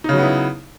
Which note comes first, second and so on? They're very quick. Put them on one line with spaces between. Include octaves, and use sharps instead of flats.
D#4 C#3 F#3 B3 E4